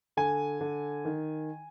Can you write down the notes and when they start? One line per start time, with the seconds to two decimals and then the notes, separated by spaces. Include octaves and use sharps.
0.17 D3 G#5
0.61 D3
1.05 D#3